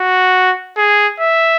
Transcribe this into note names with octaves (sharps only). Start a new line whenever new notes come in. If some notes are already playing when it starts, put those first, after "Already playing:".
Already playing: F#4
G#4
E5